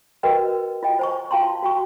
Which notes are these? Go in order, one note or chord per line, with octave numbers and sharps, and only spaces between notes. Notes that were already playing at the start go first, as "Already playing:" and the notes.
F#4 A#4 B4 D#5 G5
F4 D#5 G5
C5 G#5 C#6
F4 F5 G5 A5 C6
F#4 G5 C#6